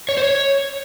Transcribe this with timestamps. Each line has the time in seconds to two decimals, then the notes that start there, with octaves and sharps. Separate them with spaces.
0.09 C#5
0.17 C5
0.24 C#5